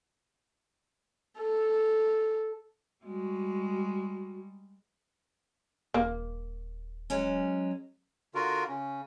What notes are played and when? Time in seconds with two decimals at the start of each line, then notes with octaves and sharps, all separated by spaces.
1.38 A4
3.04 G3 G#3 F#4
5.94 D#1 A#3
7.10 F#3 G#3 C#4
8.35 D3 F4 F#4 A#4
8.68 C#3 C#4